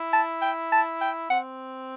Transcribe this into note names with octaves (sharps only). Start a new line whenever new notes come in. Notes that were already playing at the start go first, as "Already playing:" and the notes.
Already playing: E4
A5
G5
A5
G5
C4 F#5